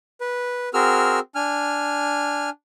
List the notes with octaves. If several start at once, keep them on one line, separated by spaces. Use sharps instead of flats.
B4
C4 F#4 G#4 A#4 E6 F6
D4 G#5 F6